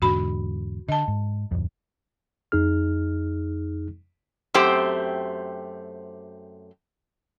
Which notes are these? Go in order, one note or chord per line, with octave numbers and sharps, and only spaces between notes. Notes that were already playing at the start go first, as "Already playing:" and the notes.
E2 G#2 D3 F#4 B5
D3 D#5 A5
G#2
D1 F2
F2 D#4 G#4 F6
F#2 A3 C4 G4 C5 G5